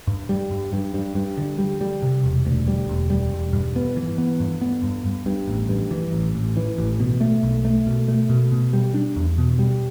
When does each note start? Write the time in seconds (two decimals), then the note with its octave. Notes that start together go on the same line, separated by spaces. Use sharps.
0.07 G2
0.29 G3
0.51 G2
0.73 G2
0.94 G2
1.15 G2
1.37 D3
1.58 G3
1.81 G3
2.02 C3
2.24 E1
2.45 D2
2.68 G3
2.89 E1
3.10 G3
3.32 E1
3.53 G2
3.76 B3
3.97 E3
4.18 B3
4.40 G2
4.61 B3
4.83 G2
5.06 G2
5.26 G2
5.48 A1
5.69 G2
5.91 E3
6.13 A1
6.35 A1
6.57 E3
6.78 A1
7.00 B2
7.21 A3
7.43 B1
7.65 A3
7.87 B2
8.08 A3
8.29 B2
8.52 B2
8.73 G3
8.94 D4
9.16 E2
9.38 B2
9.59 G3